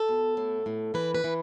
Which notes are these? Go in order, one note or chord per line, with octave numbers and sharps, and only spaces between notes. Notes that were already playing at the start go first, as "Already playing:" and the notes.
Already playing: A4
B2
A2
A2
E3 B4
B4
E3